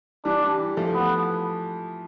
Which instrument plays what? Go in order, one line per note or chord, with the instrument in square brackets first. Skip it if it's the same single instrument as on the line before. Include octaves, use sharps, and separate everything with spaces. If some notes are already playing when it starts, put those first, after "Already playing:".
[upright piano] E3 G3 [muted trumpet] D4
[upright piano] E3 G3
F3 A3
[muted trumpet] B3